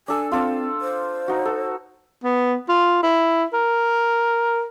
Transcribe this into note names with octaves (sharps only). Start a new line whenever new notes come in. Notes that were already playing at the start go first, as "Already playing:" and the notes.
D4 A4 G#5
C4 F4 A4 D5
C5
D#4 F#4
A4
B3
F4
E4
A#4